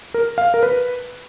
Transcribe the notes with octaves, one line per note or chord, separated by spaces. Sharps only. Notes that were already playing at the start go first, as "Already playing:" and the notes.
A#4
F5
A#4
B4